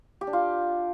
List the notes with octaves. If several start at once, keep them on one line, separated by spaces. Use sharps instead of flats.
G4
D4
F4